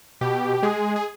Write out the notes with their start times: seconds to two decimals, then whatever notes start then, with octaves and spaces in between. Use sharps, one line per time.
0.21 B2 G4
0.63 G#3 G#4
0.96 G#4